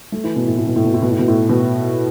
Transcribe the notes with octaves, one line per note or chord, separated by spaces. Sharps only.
A3
E3
B2
A2
A2
B2
A2
B2
A2
B2
A2
B2
A2
B2